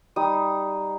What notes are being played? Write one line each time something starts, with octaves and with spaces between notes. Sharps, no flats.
G3 D#4 D#6